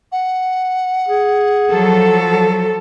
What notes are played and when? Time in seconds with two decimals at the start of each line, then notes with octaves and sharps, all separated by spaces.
0.12 F#5
1.08 G#4
1.71 F3 F#3 A4